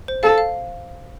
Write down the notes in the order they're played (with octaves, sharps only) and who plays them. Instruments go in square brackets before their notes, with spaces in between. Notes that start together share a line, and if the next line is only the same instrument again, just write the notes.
[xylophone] C5
[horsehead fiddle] A4 [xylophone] F5
[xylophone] F5